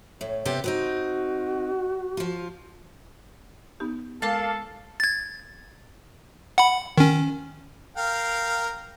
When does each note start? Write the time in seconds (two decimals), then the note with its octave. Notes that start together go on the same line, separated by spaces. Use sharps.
0.21 A2 C#5
0.45 C3 B3 G4
0.64 B3 C4 D#4 F#4
2.17 F3 F4
3.80 B3 D#4 G4
4.22 G#3 A#3 A4 F5 A5
5.00 G#6 A6
6.58 F#5 B5
6.98 D#3 C#4
7.97 A#4 F5 G5